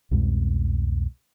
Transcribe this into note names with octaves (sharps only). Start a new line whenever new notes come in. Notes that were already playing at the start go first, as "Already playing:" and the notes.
C2 F2 B2 G#3